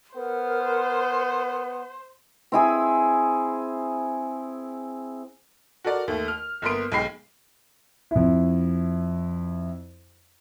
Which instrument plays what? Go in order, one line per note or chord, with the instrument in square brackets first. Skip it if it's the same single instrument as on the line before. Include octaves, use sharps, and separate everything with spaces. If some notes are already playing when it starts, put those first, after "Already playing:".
[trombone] B3 [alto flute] A#4 [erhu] C5
[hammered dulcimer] C4 E4 G#4
[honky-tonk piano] F#4 A4 A#4 D5
D#2 A3
F6
G1 A#3 B3 A#4 C6 D7
B1 G#3 G5 B5 C7
[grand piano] F2 E4